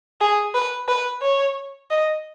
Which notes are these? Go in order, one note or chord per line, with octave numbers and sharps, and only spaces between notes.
G#4
B4
B4
C#5
D#5